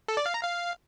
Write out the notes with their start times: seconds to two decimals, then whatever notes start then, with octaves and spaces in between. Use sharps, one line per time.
0.08 A4
0.17 D5
0.26 F5
0.34 A#5
0.43 F5